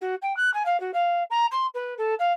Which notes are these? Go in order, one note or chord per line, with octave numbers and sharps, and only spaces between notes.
F#4
G5
F#6
G#5
F5
F#4
F5
A#5
C6
B4
A4
F5